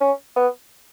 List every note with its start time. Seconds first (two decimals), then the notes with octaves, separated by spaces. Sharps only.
0.01 C#4
0.36 B3